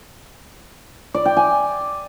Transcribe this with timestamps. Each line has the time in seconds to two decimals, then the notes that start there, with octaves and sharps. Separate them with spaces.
1.14 D5
1.25 G5
1.37 G#5